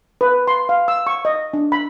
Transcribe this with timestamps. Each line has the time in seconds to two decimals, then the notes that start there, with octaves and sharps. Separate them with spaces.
0.21 B4
0.47 C6
0.69 F5
0.88 E6
1.07 C#6
1.25 D#5
1.53 D4
1.72 B5